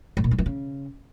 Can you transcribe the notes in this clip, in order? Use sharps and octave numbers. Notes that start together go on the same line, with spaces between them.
G#2
A#2
G2
E3
C#3